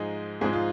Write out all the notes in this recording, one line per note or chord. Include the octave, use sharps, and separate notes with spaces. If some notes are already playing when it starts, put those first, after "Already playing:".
Already playing: G#2 F3 G#3 D#4 G#4
G#2 F3 G#3 G#4
F4